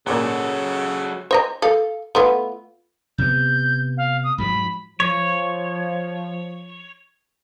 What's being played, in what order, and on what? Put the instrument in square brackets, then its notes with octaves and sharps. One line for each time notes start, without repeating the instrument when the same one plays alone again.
[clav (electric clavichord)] G#1 A#2 [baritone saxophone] C#3 [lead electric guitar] F#3 A4
[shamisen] C5 D#5 A#5
A4 F5
A3 B3 F4
[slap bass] C3 B3 [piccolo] G6
[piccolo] F5
D#6
[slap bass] G#2 F3 F#3 [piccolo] B5
[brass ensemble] F3 [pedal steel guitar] C#5